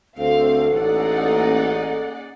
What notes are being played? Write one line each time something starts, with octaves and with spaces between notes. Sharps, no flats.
D2 C4 A4 F5
A1 A#3 C#4 D#4 G#4 D5 F#5